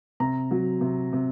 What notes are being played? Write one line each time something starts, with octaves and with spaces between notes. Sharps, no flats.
C3 A#5
F#3
C3
C3